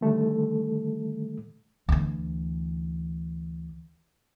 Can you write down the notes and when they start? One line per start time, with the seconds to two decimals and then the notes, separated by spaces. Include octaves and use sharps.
0.01 D3 D#3 G3 A3 A4
1.89 D2 E3